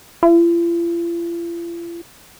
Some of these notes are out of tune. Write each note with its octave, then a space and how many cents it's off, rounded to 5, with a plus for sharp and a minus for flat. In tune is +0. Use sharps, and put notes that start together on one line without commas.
F4 -45